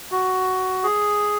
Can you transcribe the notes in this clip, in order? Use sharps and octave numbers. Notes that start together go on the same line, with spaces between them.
F#4
G#4